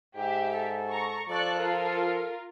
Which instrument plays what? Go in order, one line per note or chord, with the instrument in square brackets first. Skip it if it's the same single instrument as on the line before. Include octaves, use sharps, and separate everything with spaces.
[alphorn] G#2 [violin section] G4 E5
[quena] A4
[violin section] A#5 C#6
[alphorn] F3 [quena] A4 [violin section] D5 C#6 F#6
[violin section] F4 A#4